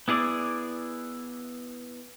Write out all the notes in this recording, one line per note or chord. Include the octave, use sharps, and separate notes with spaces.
B3 E4 G#4 D5